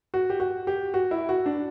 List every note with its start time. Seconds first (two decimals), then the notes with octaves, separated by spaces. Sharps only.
0.14 F#4
0.30 G4
0.40 F#4
0.67 G4
0.94 F#4
1.11 E4
1.29 F#4
1.46 D4